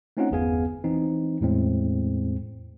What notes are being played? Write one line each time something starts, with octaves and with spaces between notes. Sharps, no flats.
A3 C4 C#4 D#4 F4 F#5
G1 E2 B3 G#4 F5 G#5
E3 C4 D#4
E2 A2 G#3 C4